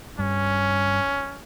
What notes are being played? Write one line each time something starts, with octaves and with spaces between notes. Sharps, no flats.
G2 C#4